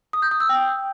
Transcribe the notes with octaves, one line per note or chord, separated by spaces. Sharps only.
D#6
G6
D#6
E6
G5